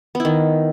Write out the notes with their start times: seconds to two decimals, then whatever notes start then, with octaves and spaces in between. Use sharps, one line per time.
0.15 B3
0.20 E4
0.25 D#3